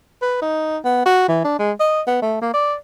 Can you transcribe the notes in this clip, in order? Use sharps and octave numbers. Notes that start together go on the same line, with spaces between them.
B4
D#4
B3
F#4
E3
D4
G#3
D#5
B3
A3
A#3
D5